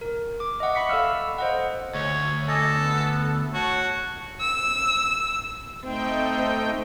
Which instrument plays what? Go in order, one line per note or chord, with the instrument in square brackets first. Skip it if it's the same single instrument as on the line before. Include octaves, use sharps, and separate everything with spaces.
[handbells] A#4
D6
D#5 E5 F#5 C#6
B5 C#6 B6 C#7
A4 D5 F5 E6 F6
C5 D#5 F#5
[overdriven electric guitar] D2 [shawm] C#5
[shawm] A4 [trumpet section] D#5 G#5 D6
[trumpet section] B3
[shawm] F#4 [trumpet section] C#5 A5
[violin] E6
[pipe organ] A3 D#4 G5 [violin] C4